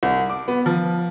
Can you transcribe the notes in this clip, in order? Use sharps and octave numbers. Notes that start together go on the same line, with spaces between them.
C2
D6
B3
F3